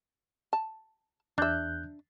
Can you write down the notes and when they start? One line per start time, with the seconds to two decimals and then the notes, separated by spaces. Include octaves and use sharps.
0.53 A5
1.38 E2 D4 E5 F#6 G6